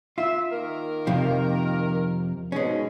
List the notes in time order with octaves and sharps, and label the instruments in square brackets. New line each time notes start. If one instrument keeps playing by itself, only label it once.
[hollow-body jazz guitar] F4 [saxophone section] E5
[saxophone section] D#3 A#3 A#4
[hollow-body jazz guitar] F2 C3 F3
[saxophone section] G#2 B2 [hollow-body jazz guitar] G#3 C#4